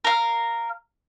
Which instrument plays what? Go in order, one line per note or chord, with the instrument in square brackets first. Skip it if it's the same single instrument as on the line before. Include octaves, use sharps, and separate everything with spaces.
[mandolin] A#4 F5